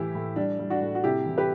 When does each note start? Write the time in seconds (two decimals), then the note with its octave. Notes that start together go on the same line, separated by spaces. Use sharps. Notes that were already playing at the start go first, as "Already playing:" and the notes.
Already playing: A2 E3 E4 G4
0.15 A2
0.36 G3 D4
0.59 G3
0.70 D4 F#4
0.81 A2
0.95 F#4
1.04 C3 E4 G4
1.26 E3
1.38 G4 B4